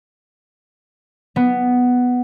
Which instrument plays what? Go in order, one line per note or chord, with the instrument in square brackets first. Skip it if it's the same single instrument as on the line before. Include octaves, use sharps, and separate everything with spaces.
[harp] B3